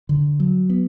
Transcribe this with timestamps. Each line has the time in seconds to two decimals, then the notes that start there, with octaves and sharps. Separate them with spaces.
0.09 D3
0.40 F#3
0.70 B3